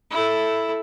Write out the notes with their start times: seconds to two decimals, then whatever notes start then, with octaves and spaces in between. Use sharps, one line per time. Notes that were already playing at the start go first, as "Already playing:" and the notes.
0.10 E4 A4